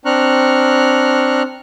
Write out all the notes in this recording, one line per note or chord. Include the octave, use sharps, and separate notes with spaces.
C4 D4 A#5 C#6 F6 F#6